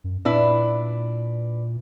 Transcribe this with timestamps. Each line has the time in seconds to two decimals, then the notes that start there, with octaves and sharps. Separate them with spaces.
0.04 F#2
0.25 A#2 D4 E4 B4